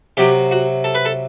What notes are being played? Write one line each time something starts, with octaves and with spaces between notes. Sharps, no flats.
C3 F#3 G4
F#4
A4
B4
A4